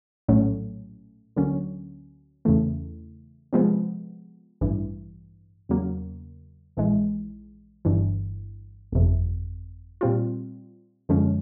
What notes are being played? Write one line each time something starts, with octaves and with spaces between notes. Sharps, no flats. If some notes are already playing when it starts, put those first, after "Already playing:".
A#1 A2 F#3 A3 C#4
D2 D3 F#3 A#3 C#4
E2 C#3 E3 A3
C3 F3 G#3 B3
A1 G2 E3
E2 C#3 F#3 A#3
A#1 G#2 E3 G#3
G1 G2 E3
G1 F2 C3
A#2 G3 C4 F4
F#2 D3 F3 G#3 C#4